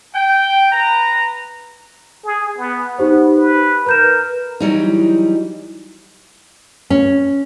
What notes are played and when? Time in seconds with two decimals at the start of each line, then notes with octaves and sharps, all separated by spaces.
0.14 G5
0.72 B4 A#5
2.25 G#4
2.58 B3
2.98 B3 D#4 G4 C5
3.37 B4
3.86 A#4 B4 G6 E7
4.60 E3 F#3 G3 D#4
6.90 C#4